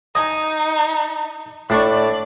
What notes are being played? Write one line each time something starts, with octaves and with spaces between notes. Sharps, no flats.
D#4 D#5 G#5
A2 D4 D5 C#6